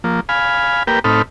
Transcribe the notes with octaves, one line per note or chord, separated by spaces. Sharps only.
F3 A#3
F5 G#5 B5
A#3 G4 A#4 B4 G5
A2 C4 D#4 A4 B5 F6